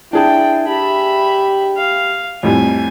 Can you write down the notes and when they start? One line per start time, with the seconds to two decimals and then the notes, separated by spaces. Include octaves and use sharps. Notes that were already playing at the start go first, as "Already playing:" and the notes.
0.13 D4 E4 G#4 G5 A5
0.68 G4 E5 B5
1.77 F5
2.43 F2 A2 G3 G#5